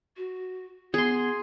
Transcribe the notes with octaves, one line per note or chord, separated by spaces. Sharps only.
F#4
B3 G#4 C6